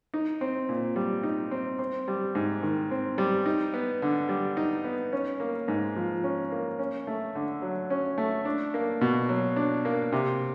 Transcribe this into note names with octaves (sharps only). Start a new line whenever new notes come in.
D#4
C4
A#2
G3
D#4
C4
C4
G3
G#2
D#3
C4
G3
D#4
B3
D3
G3
D#4
B3
C#4
A#3
G#2
F3
C#4
A#3
C#4
A3
D3
F#3
C#4
A3
D4
A#3
B2
F#3
D4
A#3
C3